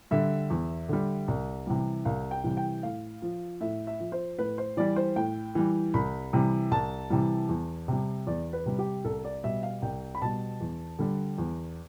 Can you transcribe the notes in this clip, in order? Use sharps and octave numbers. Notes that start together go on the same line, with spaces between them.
D3 G3 E5
E2
D3 G3
C2
C3 E3 G3
C2 F5
G5
C3 E3 G3
G5
A2 F5
F3
A2 E5
E5
F3
C5
A2 B4
C5
E3 G3 D5
C5
A2 G5
E3 G3
C2 B5
C3 E3 G3
C2 A5
C3 E3 G3
E2
C3 G3
E2 D5
B4
C3 G3
G4
C2 A4
D5
B2 G3 E5
F5
C2 G5
B5
B2 G3 A5
E2
D3 G3
E2